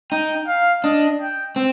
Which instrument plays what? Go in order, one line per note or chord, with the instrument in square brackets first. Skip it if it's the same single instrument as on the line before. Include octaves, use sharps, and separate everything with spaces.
[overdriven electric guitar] D#4 [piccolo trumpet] G5
[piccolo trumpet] F5
[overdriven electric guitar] D4 [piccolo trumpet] D#5
[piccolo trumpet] G5
[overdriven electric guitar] C4